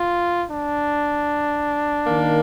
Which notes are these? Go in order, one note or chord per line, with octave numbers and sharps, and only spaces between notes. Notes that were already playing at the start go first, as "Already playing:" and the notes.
Already playing: F4
D4
D#3 A#3